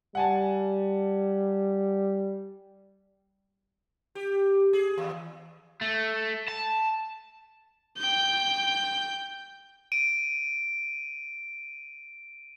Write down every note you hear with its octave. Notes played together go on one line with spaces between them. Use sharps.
G3 F#5 G#5 A5
G4
G#4
D#2
A3
A5
G5 G6
D7 D#7